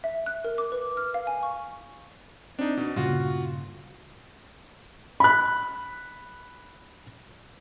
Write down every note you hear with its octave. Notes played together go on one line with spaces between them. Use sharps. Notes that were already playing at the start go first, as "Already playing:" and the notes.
E5
F#6
A#4
D6
B4
F6
F5
G#5
C#6
C4 D4 D#4
B2 D4
G2 A#2 C#3 F4 F#4
B5 F#6